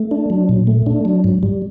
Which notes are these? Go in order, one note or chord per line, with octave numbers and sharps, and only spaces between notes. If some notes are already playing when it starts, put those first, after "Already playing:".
Already playing: A3
D4
F#3
A#2
A3
D4
F#3
G#2
G3